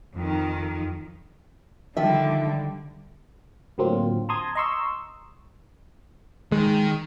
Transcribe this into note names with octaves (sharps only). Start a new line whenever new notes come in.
F2 D#3
D3 D#3 F3 G3 E5
A2 D3 F#3 A#3 C4 F4
A5 A#5 C6 D#6 G#6
D#5 A#5 C6 C#6 E6
D#3 G#3